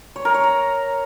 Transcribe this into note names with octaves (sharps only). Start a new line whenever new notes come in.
C#5
A#4
C#5
A#5